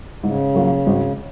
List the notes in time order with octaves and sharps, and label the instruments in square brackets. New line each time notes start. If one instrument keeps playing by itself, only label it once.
[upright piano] G#2 [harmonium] C#3
[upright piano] F#3 A#3 F4
G#1